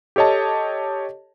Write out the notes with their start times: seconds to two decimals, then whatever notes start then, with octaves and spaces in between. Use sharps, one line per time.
0.16 G4 A4 C#5 D#5 A5